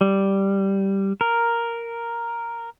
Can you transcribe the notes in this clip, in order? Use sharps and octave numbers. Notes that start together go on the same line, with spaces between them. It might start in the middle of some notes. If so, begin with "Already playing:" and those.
G3
A#4